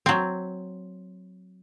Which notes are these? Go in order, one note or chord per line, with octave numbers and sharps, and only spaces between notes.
F#3 C4